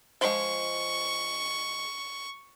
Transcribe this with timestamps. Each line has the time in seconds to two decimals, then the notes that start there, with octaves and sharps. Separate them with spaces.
0.21 F3 G#3 C#6